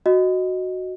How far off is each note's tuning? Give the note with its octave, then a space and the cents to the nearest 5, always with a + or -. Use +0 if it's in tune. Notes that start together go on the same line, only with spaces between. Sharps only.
F#4 +0 D#5 +0